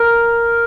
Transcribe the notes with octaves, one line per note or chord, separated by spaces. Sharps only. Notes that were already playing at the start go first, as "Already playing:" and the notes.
Already playing: A#4